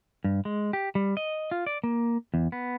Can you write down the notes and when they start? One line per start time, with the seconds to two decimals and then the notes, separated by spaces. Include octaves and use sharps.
0.24 G2
0.45 G#3
0.73 G4
0.95 G3
1.17 D#5
1.51 F4
1.66 D5
1.84 A#3
2.34 E2
2.52 B3